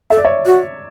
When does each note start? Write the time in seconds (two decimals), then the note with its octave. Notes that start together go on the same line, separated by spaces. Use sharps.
0.10 A4 E5
0.17 D5
0.25 C#5 E5
0.46 F#4